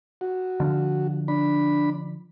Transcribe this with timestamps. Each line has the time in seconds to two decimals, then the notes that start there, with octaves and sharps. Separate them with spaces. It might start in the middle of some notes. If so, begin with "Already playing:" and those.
0.21 F#4
0.60 D3 F3
1.28 D4 B5